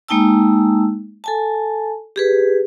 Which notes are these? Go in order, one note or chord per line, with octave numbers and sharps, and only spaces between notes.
G#3 A#3 D#4 G5 A5 E6
A4 G#5 A5
G4 G#4 B4